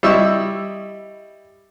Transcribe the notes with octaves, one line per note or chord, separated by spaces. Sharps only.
G3 E4 D#5 C#6 E6